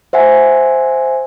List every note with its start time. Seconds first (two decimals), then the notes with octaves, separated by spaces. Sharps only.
0.13 C5 E5 F#5 G#5